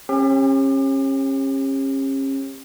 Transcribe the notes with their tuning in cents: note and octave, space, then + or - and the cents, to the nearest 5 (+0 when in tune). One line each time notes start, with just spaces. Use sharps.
C#4 -35 G4 +35